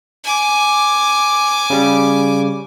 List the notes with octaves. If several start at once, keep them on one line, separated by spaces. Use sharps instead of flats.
G#5 D6
C#3 G3